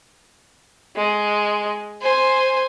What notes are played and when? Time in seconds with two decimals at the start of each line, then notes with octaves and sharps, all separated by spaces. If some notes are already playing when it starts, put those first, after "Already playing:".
0.96 G#3
2.02 C5 G#5